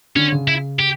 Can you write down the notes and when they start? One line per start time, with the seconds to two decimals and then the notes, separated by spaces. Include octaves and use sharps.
0.16 D3 C#4
0.32 C#3
0.48 E4
0.79 G4